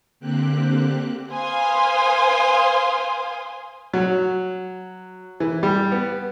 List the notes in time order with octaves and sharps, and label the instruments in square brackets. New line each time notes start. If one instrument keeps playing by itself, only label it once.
[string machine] D3 A#3 C4 G4 F#6
[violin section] B4 C5 F5 G#5 C6 D#6
[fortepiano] F#3
E3
G3
B3